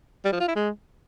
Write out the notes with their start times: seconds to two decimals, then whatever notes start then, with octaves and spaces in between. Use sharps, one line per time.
0.25 G3
0.32 F3
0.40 F4
0.48 E4
0.56 G#3